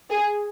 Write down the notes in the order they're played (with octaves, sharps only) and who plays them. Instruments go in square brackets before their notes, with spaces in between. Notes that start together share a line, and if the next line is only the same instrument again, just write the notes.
[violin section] G#4